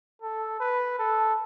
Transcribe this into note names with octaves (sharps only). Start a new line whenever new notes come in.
A4
B4
A4